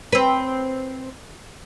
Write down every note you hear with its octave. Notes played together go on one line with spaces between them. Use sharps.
C4 B4